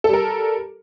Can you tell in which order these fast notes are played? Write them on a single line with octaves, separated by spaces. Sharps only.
A4 G3 A#4